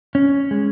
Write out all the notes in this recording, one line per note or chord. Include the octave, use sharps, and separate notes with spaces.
C#4
G#3